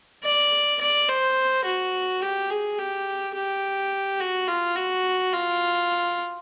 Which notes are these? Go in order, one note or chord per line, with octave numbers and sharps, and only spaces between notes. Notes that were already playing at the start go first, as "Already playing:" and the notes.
D5
D5
C5
F#4
G4
G#4
G4
G4
F#4
F4
F#4
F4